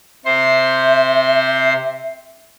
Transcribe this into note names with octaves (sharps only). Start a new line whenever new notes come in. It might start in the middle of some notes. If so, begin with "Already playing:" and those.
C3 C5 E5 C6